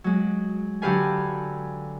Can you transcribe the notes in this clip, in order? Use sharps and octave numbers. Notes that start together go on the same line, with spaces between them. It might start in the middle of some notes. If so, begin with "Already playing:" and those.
F#3 G#3
D3 F#3 G4 B4 F5 G#5